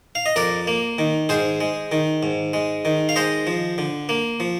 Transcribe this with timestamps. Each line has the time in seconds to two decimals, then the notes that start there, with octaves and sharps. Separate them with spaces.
0.15 F5
0.26 D#5
0.36 F2 A#4 D5
0.67 A#3
0.98 D#3
1.29 G#2 G#4 C5
1.61 G#3
1.92 D#3
2.23 G#2
2.53 G#3
2.85 D#3
3.09 F5
3.16 G#3 C5 D#5
3.47 F3
3.78 D3
4.09 A#3
4.40 F3